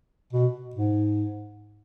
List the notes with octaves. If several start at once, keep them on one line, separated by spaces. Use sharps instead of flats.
B2
G#2